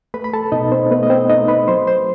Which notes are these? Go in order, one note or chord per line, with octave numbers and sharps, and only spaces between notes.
A3 B4 B5
B5
A4 A5
B2 D#4 D#5
C4 C5
A3 B3 B4
D#5
C4 C5
A3 D#4 D#5
B4 B5
F#3 C5 C6
C5 C6